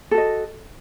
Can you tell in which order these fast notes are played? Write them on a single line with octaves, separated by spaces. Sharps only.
A4 F#4 D#5